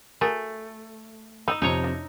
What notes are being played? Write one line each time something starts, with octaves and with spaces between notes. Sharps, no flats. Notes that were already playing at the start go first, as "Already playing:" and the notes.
A3 F#4 G#4 A#4
D#4 D#5 G5 B5 E6
F2 C3 D#4 C#5 A#5
D4 E4